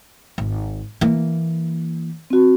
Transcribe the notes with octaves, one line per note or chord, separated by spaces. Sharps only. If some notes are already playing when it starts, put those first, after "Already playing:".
G#1
E3 A#3
C4 F#4